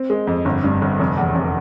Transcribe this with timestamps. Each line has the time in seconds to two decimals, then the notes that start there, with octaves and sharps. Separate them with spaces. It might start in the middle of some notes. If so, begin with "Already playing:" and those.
Already playing: C4
0.10 G#3
0.27 F2
0.45 G1
0.64 G2
0.81 G1
0.99 F1
1.17 E2
1.35 F1